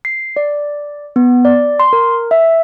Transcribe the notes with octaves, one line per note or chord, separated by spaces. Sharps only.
C7
D5
B3
D5
C6
A#4
E5